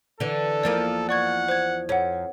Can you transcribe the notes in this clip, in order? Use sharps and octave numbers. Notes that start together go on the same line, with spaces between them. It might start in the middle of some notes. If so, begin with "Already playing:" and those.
D3 E3 A4
E2 F3 A#3 D5
D5 F#5 C#6 G#6
C5 G#6
F2 C#5 F#5